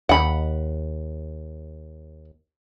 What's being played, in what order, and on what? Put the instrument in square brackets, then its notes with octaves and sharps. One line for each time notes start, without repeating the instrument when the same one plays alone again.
[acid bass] D#2 [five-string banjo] F#5 B5